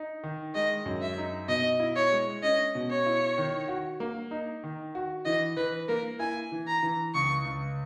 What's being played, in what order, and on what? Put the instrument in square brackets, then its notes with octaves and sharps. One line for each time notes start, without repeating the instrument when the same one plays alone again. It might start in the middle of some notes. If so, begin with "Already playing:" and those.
Already playing: [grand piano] D#4
D#3
[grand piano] G#3 [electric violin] D#5
[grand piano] F#2
[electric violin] E5
[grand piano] D#4
[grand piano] B2 [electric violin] D#5
[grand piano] E4
[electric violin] C#5
[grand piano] G#3
[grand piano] C#4 [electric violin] D#5
[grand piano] B2
[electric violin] C#5
[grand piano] E4
D#3
F#4
A#3
D#4
D#3
F#4
[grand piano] E3 [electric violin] D#5
[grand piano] E3 [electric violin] B4
[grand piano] A#3 [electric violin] A#4
[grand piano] E4 [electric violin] G#5
[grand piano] E3
[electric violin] A#5
[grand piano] E3
[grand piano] C#2 [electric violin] C#6
[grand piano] C#2